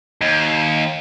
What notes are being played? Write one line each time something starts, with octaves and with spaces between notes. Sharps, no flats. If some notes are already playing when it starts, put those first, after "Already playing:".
D#2